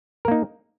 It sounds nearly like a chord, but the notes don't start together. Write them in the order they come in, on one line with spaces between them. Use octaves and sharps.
A#4 A#3 D#4